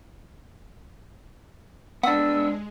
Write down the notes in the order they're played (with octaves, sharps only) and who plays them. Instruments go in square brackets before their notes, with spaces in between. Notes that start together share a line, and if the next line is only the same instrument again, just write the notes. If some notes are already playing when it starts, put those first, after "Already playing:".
[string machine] G#3 [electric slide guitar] B3 D4 [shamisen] F#5 [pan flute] E6